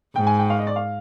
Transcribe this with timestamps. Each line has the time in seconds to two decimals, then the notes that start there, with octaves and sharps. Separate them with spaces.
0.16 G#2 G5
0.27 G#5
0.39 G5
0.50 F5
0.59 D#5
0.67 D5
0.76 F5